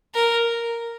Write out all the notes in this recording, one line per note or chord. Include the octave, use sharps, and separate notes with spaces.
A#4